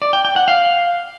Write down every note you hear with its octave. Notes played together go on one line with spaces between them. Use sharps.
D5
G5
G5
F#5
F5